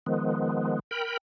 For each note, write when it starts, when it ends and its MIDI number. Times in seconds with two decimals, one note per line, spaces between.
0.06 0.79 51
0.06 0.79 53
0.06 0.79 56
0.06 0.79 59
0.91 1.17 70
0.91 1.17 79
0.91 1.17 83